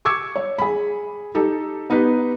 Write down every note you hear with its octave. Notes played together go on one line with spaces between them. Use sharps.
C#6 D6 E6 G#6 C#7
C#5
G#4 B5
D#4 G4 A4
B3 D#4 G4 B4